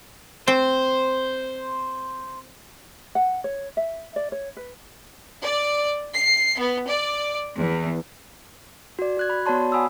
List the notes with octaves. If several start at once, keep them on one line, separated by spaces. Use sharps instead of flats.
C4 C5
F#5
C#5
E5
D5
C#5
B4
D5
C7
B3
D5
E2
F#4 D5
F#4 F#6 G#6
B5
B3 F#4 C#5 D5 A5 C6
F#5 G#5 B5 D#6 E6